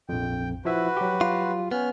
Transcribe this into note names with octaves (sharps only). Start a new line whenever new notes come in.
A#1 F2 G5
F3 E4 F#4 B4 E5
F#3 G4
F4
B3 C#4 F6